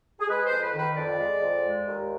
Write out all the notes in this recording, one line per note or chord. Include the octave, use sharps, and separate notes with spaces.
G#4
G#3 B4
C5
F2
B4
D#3
B4
F2 D5
G#3
F2
G#3
D#2